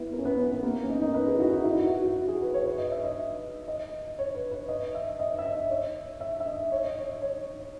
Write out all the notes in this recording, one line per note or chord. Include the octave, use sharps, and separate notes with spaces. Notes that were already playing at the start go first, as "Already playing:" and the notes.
Already playing: B3 E4
A#4
C#4
B3
C#4
B3
A#3
B3
C#4
D#4
D#4
B4
G#4
E4
F#4
D#4
E4
F#4
F#4
F#4
F#4
G#4
B4
C#5
B4
D#5
E5
D#5
D#5
C#5
B4
B4
D#5
E5
D#5
E5
D#5
C#5
E5
E5
D#5
C#5
D#5
C#5
C#5